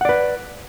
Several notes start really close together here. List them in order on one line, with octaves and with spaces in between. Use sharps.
F#5 D5 B4